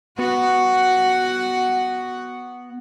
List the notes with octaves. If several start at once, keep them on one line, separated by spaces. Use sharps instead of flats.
B3 F#4 F#5